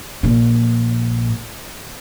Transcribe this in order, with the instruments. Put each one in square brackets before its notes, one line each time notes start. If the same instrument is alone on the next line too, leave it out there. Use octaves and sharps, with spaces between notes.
[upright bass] A#1 A#2